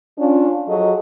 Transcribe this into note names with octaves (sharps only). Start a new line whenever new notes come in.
C#4 D4 F4
F3 F#3 F#4 G#4 A4 D#5